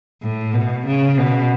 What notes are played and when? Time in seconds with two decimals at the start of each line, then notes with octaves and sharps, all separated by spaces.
0.22 A2
0.54 B2
0.86 C#3
1.18 B2